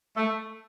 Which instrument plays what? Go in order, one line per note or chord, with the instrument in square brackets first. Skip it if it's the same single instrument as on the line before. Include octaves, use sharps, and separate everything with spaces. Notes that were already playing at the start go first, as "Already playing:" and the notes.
[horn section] A3